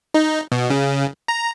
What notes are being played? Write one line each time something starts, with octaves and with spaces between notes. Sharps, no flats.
D#4
B2
C#3
A#5